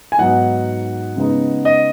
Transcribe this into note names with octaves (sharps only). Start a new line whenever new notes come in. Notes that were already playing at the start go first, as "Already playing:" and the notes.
G#5
G#2 F#3 B3 D#4 F#5
C#3 G#3 B3 D#4
D#5